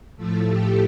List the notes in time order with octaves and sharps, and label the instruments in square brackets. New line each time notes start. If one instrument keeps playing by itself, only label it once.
[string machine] A2 F3 A3 A4
G4